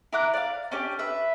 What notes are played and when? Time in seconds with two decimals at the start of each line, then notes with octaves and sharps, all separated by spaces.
0.13 E4 A#5 D6 F#6
0.34 D5 F5
0.72 C#4 D4 G4
0.99 B4 E5